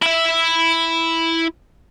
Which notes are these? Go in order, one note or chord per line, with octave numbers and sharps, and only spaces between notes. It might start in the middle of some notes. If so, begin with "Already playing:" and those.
E4 E5